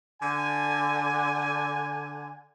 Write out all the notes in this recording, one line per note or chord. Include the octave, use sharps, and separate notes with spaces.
D3 G#5